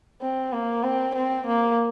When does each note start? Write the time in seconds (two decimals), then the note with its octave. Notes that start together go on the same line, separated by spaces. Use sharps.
0.22 C4
0.53 A#3
0.84 C4
1.15 C4
1.47 A#3